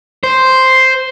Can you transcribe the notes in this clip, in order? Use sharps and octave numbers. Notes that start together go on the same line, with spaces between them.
C5